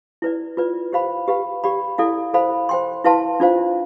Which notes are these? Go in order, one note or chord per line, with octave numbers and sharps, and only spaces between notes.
E4 B4 D5
F4 B4 D5
G4 C5 F5 B5
G4 B4 F5 B5
G4 D5 F5 B5
E4 A4 D5 F5
A4 C5 F5 B5
C5 G5 C6
E4 B4 F5 A5 C6
D4 F4 C5 F5